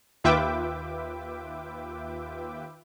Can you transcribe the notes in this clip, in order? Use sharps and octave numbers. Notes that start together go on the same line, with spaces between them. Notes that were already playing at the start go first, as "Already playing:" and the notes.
D#2 F4 B4 E5 G5 D6